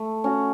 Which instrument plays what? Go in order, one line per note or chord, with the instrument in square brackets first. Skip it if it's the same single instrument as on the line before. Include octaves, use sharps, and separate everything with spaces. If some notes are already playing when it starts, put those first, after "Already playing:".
Already playing: [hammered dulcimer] A3
C#4 F#4